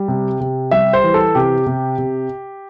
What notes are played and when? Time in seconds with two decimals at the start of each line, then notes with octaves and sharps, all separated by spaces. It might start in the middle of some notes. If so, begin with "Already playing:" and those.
Already playing: G3
0.08 C3
0.40 C3
0.71 G3 E5
0.93 C5
1.04 E3
1.14 A4
1.35 C3 G4
1.66 C3
1.98 C3